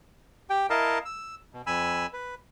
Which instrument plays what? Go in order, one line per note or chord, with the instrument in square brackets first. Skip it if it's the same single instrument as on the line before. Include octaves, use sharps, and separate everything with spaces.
[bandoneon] G4 G5
E4 A#4 D#5 F5 A5
E6
B2
F2 G#5 B5 E6
B4